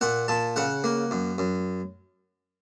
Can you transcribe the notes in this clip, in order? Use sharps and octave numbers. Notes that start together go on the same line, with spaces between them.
A#2 F#5
A#2 A5
C#3 F#5
A#3
F#2
F#2